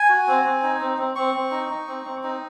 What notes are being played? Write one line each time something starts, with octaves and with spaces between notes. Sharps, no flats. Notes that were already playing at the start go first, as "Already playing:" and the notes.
Already playing: G#5
F#4
C4
C4
D#4
C4
C4
C4 C#6
C4
D#4
D#4
C4
C4
D#4